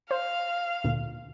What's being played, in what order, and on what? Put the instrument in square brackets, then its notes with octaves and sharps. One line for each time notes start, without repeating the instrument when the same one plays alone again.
[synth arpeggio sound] C5 [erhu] F5
[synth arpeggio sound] D2 A#2